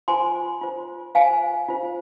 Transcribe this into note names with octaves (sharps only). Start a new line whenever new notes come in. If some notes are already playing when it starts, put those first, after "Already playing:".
F4 C5 G#5 C6
F4 C5
F4 C5 F5 G#5
F4 C5